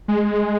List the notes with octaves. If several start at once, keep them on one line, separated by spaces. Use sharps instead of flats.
G#3